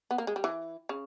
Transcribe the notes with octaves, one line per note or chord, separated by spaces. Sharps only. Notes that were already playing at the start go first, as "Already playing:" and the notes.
B3
A#3
G#3
G3
E3
C#3